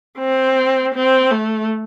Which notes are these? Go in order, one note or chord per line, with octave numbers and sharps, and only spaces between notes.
C4
C4
A3